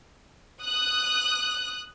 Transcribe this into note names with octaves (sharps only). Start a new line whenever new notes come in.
D#6 F#6